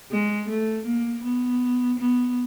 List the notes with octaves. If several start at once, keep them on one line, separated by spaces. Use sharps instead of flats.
G#3
A3
A#3
B3
B3